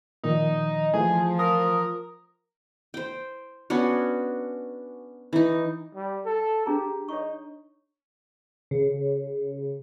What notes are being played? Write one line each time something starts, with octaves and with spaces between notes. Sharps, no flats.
A#2 D#3 F3 D#4
E3 F3 A3 G#4
A#4 D#6
C5 G5
B3 C#4 D4 F#4
E3 D#4
G3
A4
D4 G4 G#4 A#5
D#4 C#5 C#6
C#3